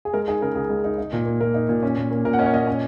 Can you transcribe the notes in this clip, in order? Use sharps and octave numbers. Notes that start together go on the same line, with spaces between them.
G#4
G#3 A#4
D#4 G#4
C#3 A#4
C#2 G#4
G#3
D#4
D#4
A#2
A#3
A#2 A#4
D#4
A#2
C#4
A#2
A#3
A#2 A#4
F#5
C#4 D#5
C#5
A#2 D#5
C#4